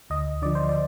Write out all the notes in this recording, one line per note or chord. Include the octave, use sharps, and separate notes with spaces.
D2 D#5
D3 F3 D5
C5
D5